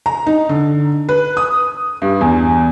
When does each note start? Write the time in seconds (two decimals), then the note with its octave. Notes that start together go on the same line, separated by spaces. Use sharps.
0.06 A#5
0.27 D#4
0.49 D3
1.09 B4
1.37 D#6
2.02 G2
2.21 E2